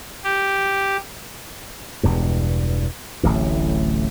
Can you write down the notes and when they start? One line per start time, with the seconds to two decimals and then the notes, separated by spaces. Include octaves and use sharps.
0.24 G4
2.03 E1 E2 G2
3.23 D1 A1 A2